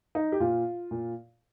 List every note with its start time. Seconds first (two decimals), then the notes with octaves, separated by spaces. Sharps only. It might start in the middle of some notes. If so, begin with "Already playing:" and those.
0.15 D#4
0.32 G4
0.40 A#2 F4
0.91 A#2